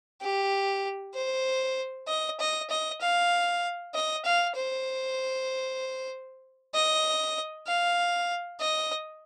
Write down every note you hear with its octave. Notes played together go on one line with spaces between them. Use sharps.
G4
C5
D#5
D#5
D#5
F5
D#5
F5
C5
D#5
F5
D#5